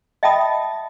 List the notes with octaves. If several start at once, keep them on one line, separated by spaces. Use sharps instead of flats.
D#5 E5 G5 A5 B5 D#6